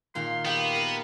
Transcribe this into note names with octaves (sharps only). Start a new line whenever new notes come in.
A#2 D#3 F5 C6
B3 G4 F5 G5
A#4